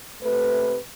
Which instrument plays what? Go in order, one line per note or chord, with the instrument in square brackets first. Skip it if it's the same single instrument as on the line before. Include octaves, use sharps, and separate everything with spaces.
[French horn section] C3 A3 B4